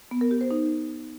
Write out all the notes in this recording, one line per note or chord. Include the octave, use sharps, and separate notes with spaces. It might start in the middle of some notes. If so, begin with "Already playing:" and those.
B3
A#4
G4
C5
D#4